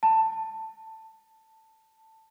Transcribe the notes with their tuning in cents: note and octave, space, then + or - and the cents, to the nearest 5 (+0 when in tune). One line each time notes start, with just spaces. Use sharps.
A5 +10